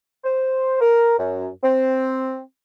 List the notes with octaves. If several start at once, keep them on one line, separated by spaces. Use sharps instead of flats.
C5
A#4
F#2
C4